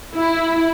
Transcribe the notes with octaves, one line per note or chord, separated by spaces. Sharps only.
E4